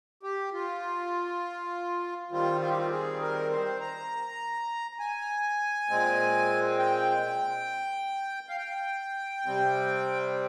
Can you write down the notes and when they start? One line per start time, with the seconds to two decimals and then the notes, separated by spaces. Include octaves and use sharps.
0.23 G4
0.53 F4
2.31 D#3 G3 C4 F4
2.61 F4
2.69 G4
2.78 F4
2.91 G#4
3.22 A#4
3.51 C5
3.80 A#5
4.99 G#5
5.90 A#2 G#3 C4
6.79 G5
8.49 F5
8.57 G5
9.46 C3 G3 C4